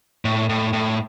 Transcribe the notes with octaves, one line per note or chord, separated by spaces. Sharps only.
A2
A2
A2